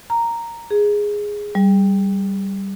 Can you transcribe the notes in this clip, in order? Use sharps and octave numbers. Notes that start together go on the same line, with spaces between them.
A#5
G#4
G3